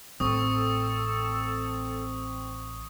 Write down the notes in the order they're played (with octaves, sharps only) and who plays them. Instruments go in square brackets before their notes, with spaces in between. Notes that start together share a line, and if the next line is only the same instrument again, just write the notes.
[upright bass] A1 [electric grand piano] C4 C5 [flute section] A4 [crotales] C#6 D#6